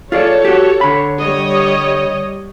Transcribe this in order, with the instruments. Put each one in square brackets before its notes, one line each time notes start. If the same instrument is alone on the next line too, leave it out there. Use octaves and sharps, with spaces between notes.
[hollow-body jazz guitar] F4 G#4 D5 [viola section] A4 C#5
[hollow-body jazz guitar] F#4 G4
D3 B5
[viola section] G3 C#5 D#5